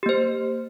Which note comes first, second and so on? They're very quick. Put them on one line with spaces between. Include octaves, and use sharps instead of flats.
G4 A#3 C5